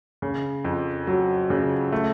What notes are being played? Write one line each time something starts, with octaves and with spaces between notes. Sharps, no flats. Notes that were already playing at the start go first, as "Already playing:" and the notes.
C#3
F2
F#3
C#3
A3